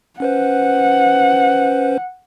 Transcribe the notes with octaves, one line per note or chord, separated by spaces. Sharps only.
C#4 B4 C5 F#5